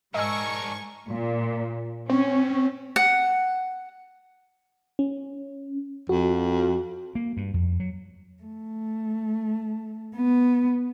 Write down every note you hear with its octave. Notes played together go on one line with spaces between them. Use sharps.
G#2 D4 A#4 D#5 G#5 C#6 E6
A#2
C4 C#4
F#5
C#4
F2 F#4
A#3
G2
F2
F#3
A3
B3